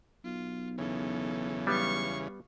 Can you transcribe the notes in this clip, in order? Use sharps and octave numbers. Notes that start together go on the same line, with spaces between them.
B1 F4
E2 C#3 D#4 A4
G3 B3 F5 C#6